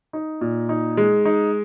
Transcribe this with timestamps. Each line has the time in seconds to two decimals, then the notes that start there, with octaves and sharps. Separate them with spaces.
0.13 D#4
0.41 A#2
0.69 D#4
0.97 G#3
1.25 D#4